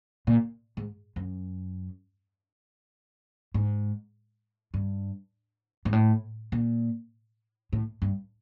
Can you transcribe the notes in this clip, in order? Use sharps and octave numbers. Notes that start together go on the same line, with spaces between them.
A#2
G#2
F#2
G#2
G2
G#2
A2
A#2
A2
G2